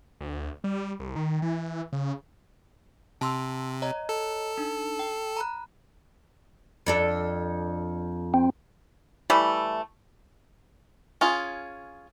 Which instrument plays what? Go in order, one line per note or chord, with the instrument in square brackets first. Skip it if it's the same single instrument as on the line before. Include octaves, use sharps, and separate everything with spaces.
[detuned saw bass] D2
G3
C2
D#3
E3
C#3
[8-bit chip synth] C3 [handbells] A5 C6 E6
[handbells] C#5 D#5 A#5
[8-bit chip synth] A4
[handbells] D4 D#4
G5
A#5 B5 F#6
[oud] F2 D4 A4
[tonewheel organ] C4
[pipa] E3 G3 A3
[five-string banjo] C#4 F4 G#4